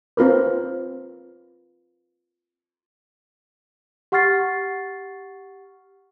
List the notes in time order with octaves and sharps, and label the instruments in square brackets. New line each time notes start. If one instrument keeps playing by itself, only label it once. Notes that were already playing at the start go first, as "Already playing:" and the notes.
[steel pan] C4 F4 A#4 B4
[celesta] G4 F#5 C#6 F6 A6 C7